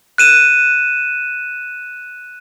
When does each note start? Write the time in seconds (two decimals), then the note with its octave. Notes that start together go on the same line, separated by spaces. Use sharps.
0.18 F#6 D#7 E7